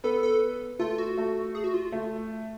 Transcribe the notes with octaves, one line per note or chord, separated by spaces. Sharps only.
B3 A4 B4
A4
A3 F4 A4
F#4
A3 A4
G#4
F#4
F4
A3